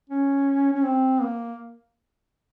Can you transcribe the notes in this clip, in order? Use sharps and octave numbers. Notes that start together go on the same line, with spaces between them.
C#4
C#4
C4
A#3